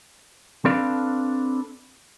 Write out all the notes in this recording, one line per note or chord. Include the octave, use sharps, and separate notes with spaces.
C4 D4 A4 B4 D5 F5